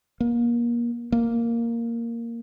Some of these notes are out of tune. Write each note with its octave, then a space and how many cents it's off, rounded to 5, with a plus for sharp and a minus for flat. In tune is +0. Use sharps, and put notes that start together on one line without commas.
A#3 +30
A#3 -5